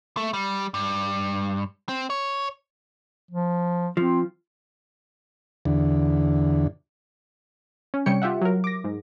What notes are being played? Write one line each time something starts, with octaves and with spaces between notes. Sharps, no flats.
A3
G3
G2
C4
C#5
F3
F3 C4
E2 D3
C#4
C3 G3 C#5 G5 C#7
F4 G4 E5 F#5
F#3 A#4
D6 A#6
G#2